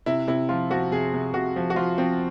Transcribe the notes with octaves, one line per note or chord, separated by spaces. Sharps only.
C3 E4
C3 E4
F3 F4
F3 F#4
C3 G#4
C3
C3 F#4
F3
F#4
F3 F4
F3 C4